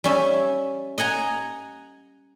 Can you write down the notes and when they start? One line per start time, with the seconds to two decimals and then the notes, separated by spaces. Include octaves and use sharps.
0.04 G3 C#4 E5
0.98 D#5 F#5 G#5 A#5